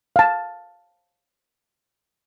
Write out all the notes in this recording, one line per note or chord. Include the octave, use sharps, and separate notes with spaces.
F5 A5